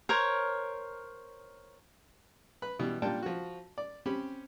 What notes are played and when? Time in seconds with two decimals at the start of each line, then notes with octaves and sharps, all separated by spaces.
0.09 A#4 C5 C#5
2.62 B4 B5
2.79 B2 E3 G3
3.02 A#2 G3 D4 G5 A5
3.23 F3 F#4
3.78 D5
4.06 C4 C#4 G4 B5